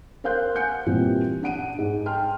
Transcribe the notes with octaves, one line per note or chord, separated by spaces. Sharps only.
A#4 C5 F5 C6 F#6 G6
F#5 G#5 G6 C#7
A#2 E3 G3 C4 F4
D4 F#5 D7 D#7
G#2
G5 A5 C6 F6